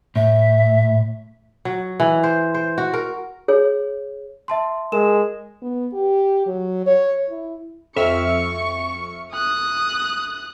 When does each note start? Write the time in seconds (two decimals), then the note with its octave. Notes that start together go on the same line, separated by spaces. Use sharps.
0.16 A2 E5
1.65 F#3
2.00 E3
2.23 C5
2.54 C5
2.78 F#4
2.94 A#4
3.48 G#4 C#5
4.48 E5 A5 C6
4.92 G#3 A#4 E7
5.62 B3
5.93 G4
6.47 F#3
6.87 C#5
7.30 E4
7.96 F2 E5 C#6 F6
9.33 D#6 F#6